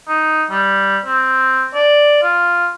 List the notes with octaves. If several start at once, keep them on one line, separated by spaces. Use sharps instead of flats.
D#4
G3
C4
D5
F4